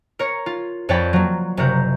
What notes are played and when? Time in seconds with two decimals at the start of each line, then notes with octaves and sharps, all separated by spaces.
0.19 A#4 C#5 C#7
0.46 F4
0.89 F2 C#5 D5 G5 B5
1.13 F#3 A#3
1.57 F#1 C3 F#4 A#4 G6